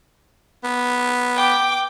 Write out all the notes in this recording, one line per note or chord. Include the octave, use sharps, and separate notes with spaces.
B3
G5 D6